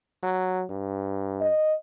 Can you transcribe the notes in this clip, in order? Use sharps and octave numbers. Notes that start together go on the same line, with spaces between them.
F#3
G2
D#5